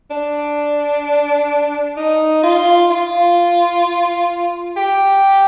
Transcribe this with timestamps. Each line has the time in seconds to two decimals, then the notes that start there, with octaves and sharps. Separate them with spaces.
0.11 D4
1.97 D#4
2.43 F4
2.91 F4
4.77 G4